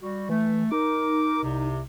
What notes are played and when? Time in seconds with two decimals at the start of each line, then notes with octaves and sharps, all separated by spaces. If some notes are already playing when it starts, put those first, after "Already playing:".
0.01 G3 F#4
0.29 E3 A3
0.72 D#4 A#4 D6
1.43 C2 C3